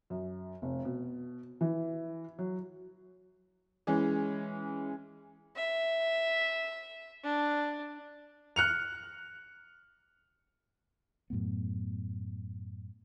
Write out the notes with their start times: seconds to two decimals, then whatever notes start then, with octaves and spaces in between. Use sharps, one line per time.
0.10 F#2
0.62 F1
0.85 B2
1.61 E3
2.39 F#3
3.87 E3 G#3 C#4
5.56 E5
7.24 D4
8.56 F6 F#6 C#7 F7
11.30 F#2 A2 A3 B3